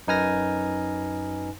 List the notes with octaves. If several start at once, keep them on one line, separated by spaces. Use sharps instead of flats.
F#2 D#4 B4 G#5 F6 A#6